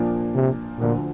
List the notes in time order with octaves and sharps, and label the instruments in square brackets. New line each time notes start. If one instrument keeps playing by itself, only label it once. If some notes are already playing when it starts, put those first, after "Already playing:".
Already playing: [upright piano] A#2 F3 A#3 D4
[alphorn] C3
[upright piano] D2 D3 F3 [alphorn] A#2